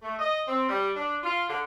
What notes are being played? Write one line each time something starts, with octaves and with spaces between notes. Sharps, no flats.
A3
D#5
C4
G3
D4
F4
D3